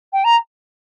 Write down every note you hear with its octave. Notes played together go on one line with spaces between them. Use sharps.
G5
A#5